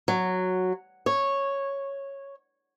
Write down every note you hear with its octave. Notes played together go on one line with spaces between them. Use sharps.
F#3
C#5